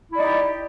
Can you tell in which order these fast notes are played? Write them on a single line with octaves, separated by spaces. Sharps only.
E4 D5 D#4 G4